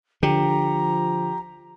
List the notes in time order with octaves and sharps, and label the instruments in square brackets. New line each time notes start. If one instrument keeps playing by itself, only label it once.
[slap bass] D3 [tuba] F3 [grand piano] G4 [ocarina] A#5